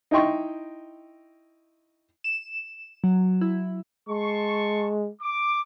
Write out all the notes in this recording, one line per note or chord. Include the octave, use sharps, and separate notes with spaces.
D#4 E4 D#5 G5 C6 C#6
E7
F#3
E4
G#3 A5 C6 C#6
D6